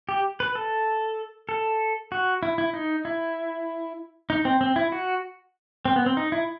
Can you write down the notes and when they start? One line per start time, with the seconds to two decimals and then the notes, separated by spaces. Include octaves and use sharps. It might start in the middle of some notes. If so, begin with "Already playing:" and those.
0.09 G4
0.40 B4
0.55 A4
1.49 A4
2.12 F#4
2.43 E4
2.58 E4
2.74 D#4
3.05 E4
4.30 D#4
4.45 C4
4.61 C4
4.76 E4
4.92 F#4
5.85 C4
5.96 B3
6.06 C4
6.17 D#4
6.32 E4